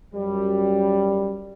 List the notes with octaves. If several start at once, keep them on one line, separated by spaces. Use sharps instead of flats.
F#2 G3